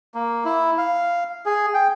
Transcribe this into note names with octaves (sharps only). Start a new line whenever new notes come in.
A#3
E4
F5
G#4
G5